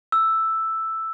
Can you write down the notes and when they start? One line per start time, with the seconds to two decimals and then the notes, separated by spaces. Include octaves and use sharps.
0.12 E6